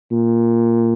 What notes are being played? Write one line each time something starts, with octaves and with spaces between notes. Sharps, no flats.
A#2